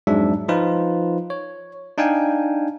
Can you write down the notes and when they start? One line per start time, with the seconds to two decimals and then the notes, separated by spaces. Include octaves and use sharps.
0.07 F2 G#2 F#3 G#3 D4 E5
0.48 F3 D#4 F4 B4
1.30 C#5
1.97 D4 D#4 F5 G5 G#5